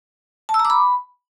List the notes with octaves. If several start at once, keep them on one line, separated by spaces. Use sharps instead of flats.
A5
E6
A#5
D6
B5